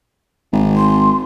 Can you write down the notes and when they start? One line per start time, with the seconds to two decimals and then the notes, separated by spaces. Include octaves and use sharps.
0.52 G#1
0.76 C6